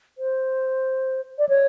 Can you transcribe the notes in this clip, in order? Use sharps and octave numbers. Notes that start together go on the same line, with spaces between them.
C5
D5
C#5